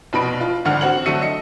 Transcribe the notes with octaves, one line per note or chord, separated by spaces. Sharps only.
F1 B2 B5 D7
F4
G#1 D3 F#5 F6
C4 F#4 F#5 F#7
D3 F#3 A3 E6 C#7 D#7
D#5 C#7